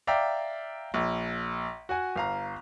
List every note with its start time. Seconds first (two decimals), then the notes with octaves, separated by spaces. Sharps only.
0.07 D5 E5 F5 G5 A#5
0.94 A#1
1.89 F#4 F#5 G#5
2.16 G1 F5 A#5